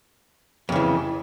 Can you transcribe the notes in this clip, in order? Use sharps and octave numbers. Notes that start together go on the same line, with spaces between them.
F2 C#3 E3